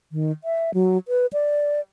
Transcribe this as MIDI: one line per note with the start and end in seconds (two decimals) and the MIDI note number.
0.12 0.31 51
0.44 0.71 76
0.74 0.98 54
1.08 1.26 71
1.33 1.80 74